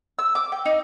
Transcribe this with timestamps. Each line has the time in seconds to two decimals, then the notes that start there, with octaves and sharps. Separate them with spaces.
0.19 E6
0.35 D6
0.52 G5
0.66 D#4